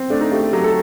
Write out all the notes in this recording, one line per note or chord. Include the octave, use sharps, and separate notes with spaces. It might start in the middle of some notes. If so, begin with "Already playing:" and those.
Already playing: C4
A3 D4
D#4
A3 G4
G4
F#3 G4
A4